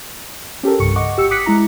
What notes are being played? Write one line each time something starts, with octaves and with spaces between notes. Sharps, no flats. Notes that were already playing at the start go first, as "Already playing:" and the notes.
C#4 G4 A4 A#4
C2 G2 C#3 C#6 C#7
D#5 F#5 C#6 D6
G#1 G4 E6 C#7
D6 D#6 F#6 B6 C#7
G#3 E4 A#5